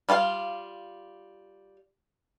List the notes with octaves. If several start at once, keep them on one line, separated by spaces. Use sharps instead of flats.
G3 F4 G#4 F5